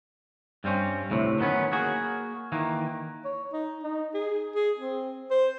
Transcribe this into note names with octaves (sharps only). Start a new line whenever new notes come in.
G2 G3 C4 C#4
D2 A2 C3
D#3 F#3 A3 B3 C#4
A#3 F#4 G#4
D#3 E3 A#3
C#5
D#4
D#4
G#4
G#4
C4
C5